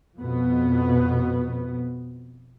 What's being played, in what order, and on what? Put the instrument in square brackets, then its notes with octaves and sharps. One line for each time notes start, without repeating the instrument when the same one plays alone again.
[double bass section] F2 B2 B3